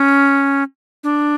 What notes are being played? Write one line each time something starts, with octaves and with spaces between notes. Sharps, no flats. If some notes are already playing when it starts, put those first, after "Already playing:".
Already playing: C#4
D4